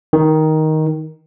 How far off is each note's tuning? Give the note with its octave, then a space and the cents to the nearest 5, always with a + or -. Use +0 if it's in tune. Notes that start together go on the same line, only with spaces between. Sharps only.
D#3 +10